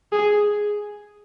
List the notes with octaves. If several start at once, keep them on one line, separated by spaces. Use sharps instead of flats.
G#4